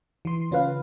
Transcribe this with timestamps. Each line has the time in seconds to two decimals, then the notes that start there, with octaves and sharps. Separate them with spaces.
0.25 E3 C6
0.51 C#3 C#4 F4 B4 F5